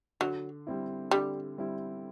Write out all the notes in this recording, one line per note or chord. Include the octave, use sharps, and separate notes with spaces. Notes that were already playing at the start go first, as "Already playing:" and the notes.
D3 F#3
G3 C4 E4
D3 G3
G3 C4 E4